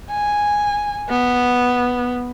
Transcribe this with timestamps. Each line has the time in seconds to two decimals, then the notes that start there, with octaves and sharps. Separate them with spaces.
0.11 G#5
1.10 B3